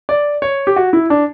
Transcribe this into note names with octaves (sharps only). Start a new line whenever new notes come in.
D5
C#5
G4
F#4
E4
D4